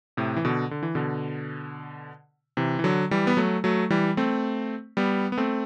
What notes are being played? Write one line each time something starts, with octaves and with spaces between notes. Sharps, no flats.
A2 C3
E3
B2 D3
D3
E3
B2 D3
C3 E3
E3
D3 F#3
E3 G3
B3
F#3 A3
F#3 A3
E3 G3
A3 C4
G3 B3
B3
A3 C4